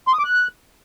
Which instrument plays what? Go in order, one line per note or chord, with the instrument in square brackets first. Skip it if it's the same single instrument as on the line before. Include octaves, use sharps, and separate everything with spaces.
[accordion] C6
D#6
D6
F#6